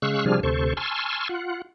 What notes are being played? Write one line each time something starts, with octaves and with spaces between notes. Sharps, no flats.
C#3 G#3 F5 C#6 E6 F#6
C3 F3 G3 D4 G#4 F6
D2 C3 A4 C5 C#6
G#5 A5 C6 C#6 E6 F6
F4 F#5